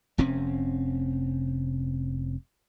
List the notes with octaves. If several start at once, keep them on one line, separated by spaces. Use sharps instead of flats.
F1 C3 C4 C#4